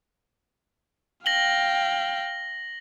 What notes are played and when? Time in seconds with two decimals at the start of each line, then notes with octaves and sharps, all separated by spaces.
1.26 F5 G5 A#6 F#7 G7